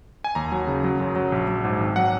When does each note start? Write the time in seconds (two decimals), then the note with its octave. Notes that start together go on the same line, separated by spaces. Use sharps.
0.24 G#5
0.35 D#2 A#5
0.52 F#3
0.67 C#3
0.84 F#3
1.00 F#2
1.16 F#3
1.32 A#1
1.48 F#3
1.64 G#2
1.80 G#1
1.96 F#3 F#5